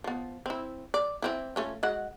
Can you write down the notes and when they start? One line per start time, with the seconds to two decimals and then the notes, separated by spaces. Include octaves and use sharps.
0.04 F3 B3
0.46 C4 E4
0.94 D5
1.22 E3 C4 E4
1.56 A3 C#4 F4
1.83 G#3 F#4 F#5